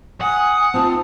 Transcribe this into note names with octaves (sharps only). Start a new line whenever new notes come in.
F#5 G#5 D#6
C4 D#4 F4 A5